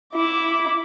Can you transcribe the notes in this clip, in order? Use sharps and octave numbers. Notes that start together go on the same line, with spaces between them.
E4 D6